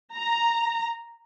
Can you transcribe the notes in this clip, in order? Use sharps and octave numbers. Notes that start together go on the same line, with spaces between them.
A#5